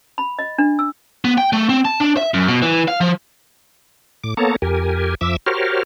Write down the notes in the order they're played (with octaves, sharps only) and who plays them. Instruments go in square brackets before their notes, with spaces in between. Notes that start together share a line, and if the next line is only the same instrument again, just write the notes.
[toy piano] B5
D#5
D4
E6
[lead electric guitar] B3
G5
A3
C4
A5
D4
E5
F#2
B2
E3
F5
F3
[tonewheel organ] A2 D6
A#3 B3 A4 C#5 A5 A#5
F2 G4 A#4 G#5
F2 F3 E5 D6 E6
F#4 G4 A#4 C5 C#5 F6